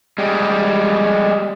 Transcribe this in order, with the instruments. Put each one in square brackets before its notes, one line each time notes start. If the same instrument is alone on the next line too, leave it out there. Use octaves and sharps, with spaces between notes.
[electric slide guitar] G3 G#3